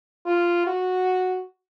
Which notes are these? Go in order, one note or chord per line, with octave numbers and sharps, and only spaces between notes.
F4
F#4